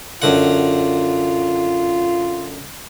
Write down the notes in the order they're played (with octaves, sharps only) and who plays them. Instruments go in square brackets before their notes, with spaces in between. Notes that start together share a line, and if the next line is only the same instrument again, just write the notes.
[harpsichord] F#2 D3 F#5 [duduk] F4